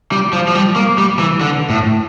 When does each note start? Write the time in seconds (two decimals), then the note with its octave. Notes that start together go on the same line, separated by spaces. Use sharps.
0.12 G3
0.33 F3
0.48 F3
0.55 G3
0.76 A#3
0.98 G3
1.19 E3
1.41 D3
1.70 A2